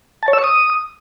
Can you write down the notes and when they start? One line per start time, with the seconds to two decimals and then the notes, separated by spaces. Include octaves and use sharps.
0.23 A5
0.28 C#5
0.33 E6
0.39 C#6
0.44 D#6